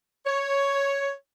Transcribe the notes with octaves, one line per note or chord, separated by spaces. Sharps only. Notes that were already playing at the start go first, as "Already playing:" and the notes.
C#5